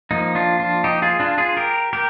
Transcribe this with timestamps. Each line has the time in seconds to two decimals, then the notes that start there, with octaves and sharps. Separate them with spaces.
0.11 F3 A#3 D#4
0.35 D4 F4
0.60 D4 F4
0.84 D#4 G4
1.02 F4 G#4
1.20 D4 F4
1.38 F4 G#4
1.57 G4 A#4
1.93 G4 A#4